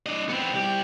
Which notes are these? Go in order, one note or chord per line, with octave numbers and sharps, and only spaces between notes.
D4 D#5
B3 C4
C2 G4